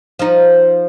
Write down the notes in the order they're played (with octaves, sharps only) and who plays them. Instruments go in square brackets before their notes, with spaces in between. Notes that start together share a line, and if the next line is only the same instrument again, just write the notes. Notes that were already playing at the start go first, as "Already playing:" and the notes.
[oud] F3 D#4